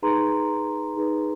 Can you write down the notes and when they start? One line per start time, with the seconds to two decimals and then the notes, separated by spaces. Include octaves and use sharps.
0.03 D#4 G#4 B4 A#5 C6
0.97 D#4 G#4 B4